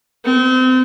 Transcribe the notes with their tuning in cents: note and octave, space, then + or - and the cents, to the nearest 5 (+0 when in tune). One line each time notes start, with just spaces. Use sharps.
C4 -30